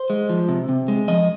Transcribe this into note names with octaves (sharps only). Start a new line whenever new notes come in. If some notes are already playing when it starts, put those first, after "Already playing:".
Already playing: C5
G#3
F3
C3
C3
G#3
F3 D#5